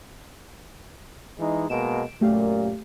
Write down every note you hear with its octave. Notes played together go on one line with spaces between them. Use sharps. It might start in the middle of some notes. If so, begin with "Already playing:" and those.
E3 G#3 D#4
B2 G#3 A#3 D7 E7
F#2 A#2 A3 G4 F5